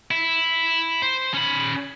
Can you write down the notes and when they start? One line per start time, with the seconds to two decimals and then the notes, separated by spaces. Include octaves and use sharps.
0.11 E4
1.02 C5
1.34 C#4 B5